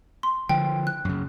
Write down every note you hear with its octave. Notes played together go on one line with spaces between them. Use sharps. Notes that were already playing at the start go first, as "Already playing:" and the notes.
C6
D3 F3 G5
F#6
F#2 C#3